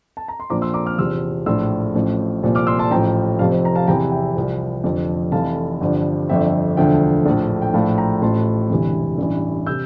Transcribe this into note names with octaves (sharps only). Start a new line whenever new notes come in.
A5
A#5
C6
A#1 A#2 F3 A#5 D6
C6 E6
A#5 D6
D6 F6
E2 C3 F3 C6 E6
A#1 A2 F3 C6 E6
A1 A2 F3
C2 A#2 F3
D6 F6
C6 E6
A5 C6
A1 A2 F3 G5 A#5
F1 F2 C3 F3 F5 A5
C5
A#5
F5 A5
E2 C3 E3 G5 A#5
E5 G5
C2 C3 F3
F1 F2 D3 F3
F1 F2 E3 F5 A5
G1 G2 F3
G1 F2 D3 F3 E5 G5
E1 D2 D3 F3 E5 G5
A#1 A2 F3
G5
A#1 A2 F3 F5 A5
G5 A#5
A1 A2 F3 A5 C6
E1 D2 C3 E3
A1 G2 E3
C3 E6 G6